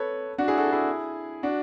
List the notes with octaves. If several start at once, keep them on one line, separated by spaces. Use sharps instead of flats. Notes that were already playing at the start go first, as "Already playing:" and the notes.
Already playing: A4 B4 C#5
D4 F#4
E4 G#4
F#4 A4
E4 G#4
D4 F#4